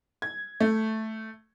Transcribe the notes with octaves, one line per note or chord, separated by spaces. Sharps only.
G#6
A3